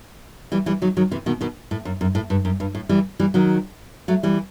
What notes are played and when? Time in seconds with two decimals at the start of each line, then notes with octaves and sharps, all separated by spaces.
0.52 E3 G3
0.66 E3 G3
0.82 D#3 F#3
0.97 D#3 F#3
1.11 C3 E3
1.26 B2 D#3
1.41 B2 D#3
1.71 A2
1.85 F#2
2.01 F#2
2.15 A2
2.30 G2
2.45 F#2
2.60 G2
2.75 A2
2.89 E3 G3
3.20 E3 G3
3.34 D#3 F#3
4.08 F#3 A3
4.23 E3 G3